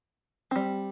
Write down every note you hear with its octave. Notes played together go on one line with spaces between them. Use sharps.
G3 C4